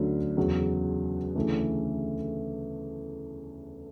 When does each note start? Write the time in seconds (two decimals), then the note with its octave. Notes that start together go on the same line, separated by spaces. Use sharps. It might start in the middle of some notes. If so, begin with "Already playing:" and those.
Already playing: D2 D3 F#3 C#4 F#4
0.37 E2 C#3 F#3
1.36 D2 C#3 E3 A3